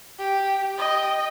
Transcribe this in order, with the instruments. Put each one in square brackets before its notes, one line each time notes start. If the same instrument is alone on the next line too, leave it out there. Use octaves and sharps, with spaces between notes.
[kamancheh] G4
D#5 G5